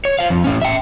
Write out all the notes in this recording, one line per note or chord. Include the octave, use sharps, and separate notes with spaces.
C#5
C5 F5
F2
A2 C#4
E5 G5